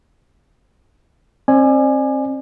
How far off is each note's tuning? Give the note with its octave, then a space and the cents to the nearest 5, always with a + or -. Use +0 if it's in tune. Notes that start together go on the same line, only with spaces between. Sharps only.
C4 +30 D5 +35 G#5 +0